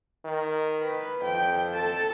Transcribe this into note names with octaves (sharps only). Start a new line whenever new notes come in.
D#3
B4
F2 G5
A4 A5